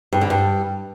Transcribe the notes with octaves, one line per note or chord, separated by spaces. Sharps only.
G2
D3
G2